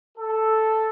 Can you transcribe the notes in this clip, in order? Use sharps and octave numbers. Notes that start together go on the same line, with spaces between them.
A4